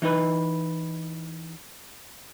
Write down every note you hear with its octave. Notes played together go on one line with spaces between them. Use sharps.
E3 D#4 B4